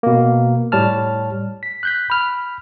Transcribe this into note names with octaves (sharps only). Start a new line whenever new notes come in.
B2 A#3
A2 G3 C#5 A5 F6
B6
F#6 G6 B6
B5 F6